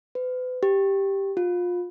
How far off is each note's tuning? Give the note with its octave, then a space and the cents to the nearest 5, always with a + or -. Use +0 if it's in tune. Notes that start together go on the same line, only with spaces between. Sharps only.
B4 +40
G4 +0
F4 +25